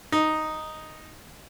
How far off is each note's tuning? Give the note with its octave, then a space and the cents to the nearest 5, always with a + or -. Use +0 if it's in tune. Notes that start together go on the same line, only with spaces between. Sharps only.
D#4 +0